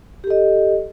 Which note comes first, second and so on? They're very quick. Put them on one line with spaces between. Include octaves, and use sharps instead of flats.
G4 A4 D#5